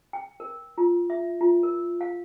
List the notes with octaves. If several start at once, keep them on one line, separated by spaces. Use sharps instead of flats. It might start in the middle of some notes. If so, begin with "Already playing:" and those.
G5
A#4
F4
E5
F4
A#4
F5